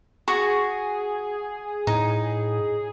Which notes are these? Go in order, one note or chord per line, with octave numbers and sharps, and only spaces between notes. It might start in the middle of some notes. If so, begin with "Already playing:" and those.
F#4 G#4 C#6
A2 D#4